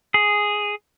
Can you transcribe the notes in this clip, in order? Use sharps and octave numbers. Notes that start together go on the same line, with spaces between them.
G#4